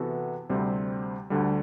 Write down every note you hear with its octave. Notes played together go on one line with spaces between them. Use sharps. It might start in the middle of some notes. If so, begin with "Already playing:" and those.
Already playing: C3 E3 B3 F#4 A4
D2 C3 G3 C4
D2 D3 G3